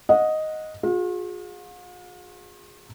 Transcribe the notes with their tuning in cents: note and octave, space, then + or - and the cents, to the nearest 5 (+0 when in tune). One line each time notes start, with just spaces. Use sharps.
D#5 +0 F#5 -20
F4 +45 G#4 -10